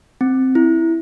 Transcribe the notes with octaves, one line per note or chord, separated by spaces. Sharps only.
C4
E4